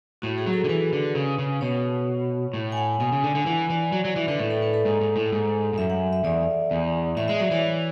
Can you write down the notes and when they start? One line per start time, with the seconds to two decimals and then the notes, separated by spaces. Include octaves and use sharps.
0.22 A2 F#4
0.38 G#4
0.46 F#3
0.53 A4
0.64 D3
0.69 E3 B4
0.93 D3
1.15 C#3
1.39 C#3
1.61 B2 C#5
2.53 A2
2.72 G#5
2.77 F#5
3.00 B2 G#5
3.12 C#3
3.24 D3
3.35 D3
3.46 E3 F#5
3.70 E3 D5
3.92 F#3 D5
4.05 F#3
4.16 E3 E5
4.28 D3 B4
4.39 A2 A4
4.51 A4
4.62 B4
4.74 A4
4.85 G#2
5.01 G#2
5.16 A2
5.32 G#2
5.73 G#2
5.78 F#2 E5
5.90 F#5
6.13 E5
6.24 E2 D5
6.71 E2
7.17 A2 E5
7.28 G#3 E5
7.41 F#3 D5
7.51 E3 C#5